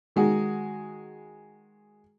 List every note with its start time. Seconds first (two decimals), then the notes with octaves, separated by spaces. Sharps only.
0.16 D#3 G#3 F#4